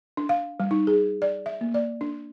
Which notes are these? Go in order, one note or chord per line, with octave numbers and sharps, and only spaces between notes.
D4
F5
G3
D#4
G#4
D5
E5
A#3
D5
D4